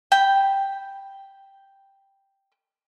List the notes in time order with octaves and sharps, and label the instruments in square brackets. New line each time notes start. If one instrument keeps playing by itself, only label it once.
[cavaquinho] G5 B5